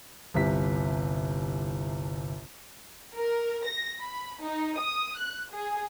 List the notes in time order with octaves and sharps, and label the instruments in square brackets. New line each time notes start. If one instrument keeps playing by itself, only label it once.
[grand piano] G1 C2 C3 B6
[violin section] A#4
A#6
B5
D#4
D#6
F#6
G#4